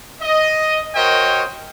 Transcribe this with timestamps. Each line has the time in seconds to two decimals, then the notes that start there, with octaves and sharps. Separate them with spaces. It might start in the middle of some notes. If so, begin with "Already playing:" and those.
0.21 D#5
0.95 F#4 A#4 C5 C#5 D#5 G5